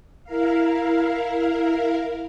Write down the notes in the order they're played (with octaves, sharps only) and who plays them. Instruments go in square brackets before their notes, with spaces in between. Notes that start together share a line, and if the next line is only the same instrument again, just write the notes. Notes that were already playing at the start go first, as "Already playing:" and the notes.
[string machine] E4 A#4 F5